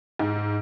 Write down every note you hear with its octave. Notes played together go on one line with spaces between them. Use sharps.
G#2